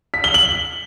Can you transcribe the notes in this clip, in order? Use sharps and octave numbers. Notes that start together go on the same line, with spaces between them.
B6
G7
F#7